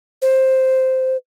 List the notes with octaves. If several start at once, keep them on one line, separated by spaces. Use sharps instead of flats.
C5